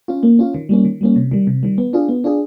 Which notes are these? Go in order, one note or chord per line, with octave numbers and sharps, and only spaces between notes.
C#4 F4
A#3
C#4 F4
D#3
G3 A#3 C#4
D#3
G3 A#3 C#4
C3
D#3 G3
C3
D#3 G3
B3
D4 F4 G#4
B3
D4 F4 G#4